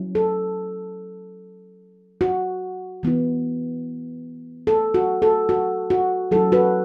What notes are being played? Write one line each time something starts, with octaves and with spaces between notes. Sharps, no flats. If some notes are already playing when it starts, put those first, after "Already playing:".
Already playing: F#3 C#4 E4
A4
F#4
E3 B3 E4
A4
F#4
A4
F#4
F#4
F#3 C#4 E4 A4
F#4 B4